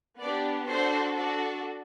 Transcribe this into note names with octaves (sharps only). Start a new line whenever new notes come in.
B3 D4 G4 D5
D4 F#4 A4 C5
D4 F#4 A4